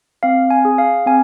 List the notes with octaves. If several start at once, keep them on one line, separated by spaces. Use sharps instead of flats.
C4 F5
G#5
G#4
F5
C4 G#5